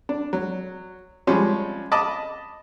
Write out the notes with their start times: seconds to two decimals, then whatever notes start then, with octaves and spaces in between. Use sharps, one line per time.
0.09 D4
0.33 F#3
1.27 F3 G3 G#3 C#4
1.92 D#5 A5 B5 D6